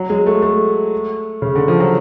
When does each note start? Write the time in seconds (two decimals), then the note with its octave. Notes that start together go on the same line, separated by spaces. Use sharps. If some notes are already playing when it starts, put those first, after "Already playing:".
Already playing: F#3
0.10 G#3
0.27 A3
0.42 A3
1.42 C#3
1.55 D3
1.68 F3
1.80 F#3